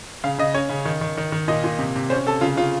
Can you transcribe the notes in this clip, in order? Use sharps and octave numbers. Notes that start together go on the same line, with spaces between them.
C#3 F5
C#3 D#5
C#4 C#5
C#3
D#3
D#3
D#3
D#3
A#2 D#5
A#2
C3
C3
C#4 C5
C3 A4
C#3 F4
C#3 F4